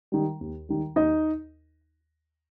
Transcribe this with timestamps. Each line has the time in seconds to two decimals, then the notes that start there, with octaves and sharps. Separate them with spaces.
0.12 D#3 G3
0.41 D#2
0.69 D#3 G3
0.96 D#2 D#4 D#5